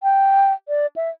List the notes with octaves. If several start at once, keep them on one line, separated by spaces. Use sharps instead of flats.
G5
D5
E5